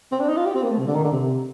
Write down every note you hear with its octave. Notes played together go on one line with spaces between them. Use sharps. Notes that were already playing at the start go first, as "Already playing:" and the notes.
C4
D4
D#4
F4
G4
C4
A#3
A3
C3
D3
D#3
D3
C3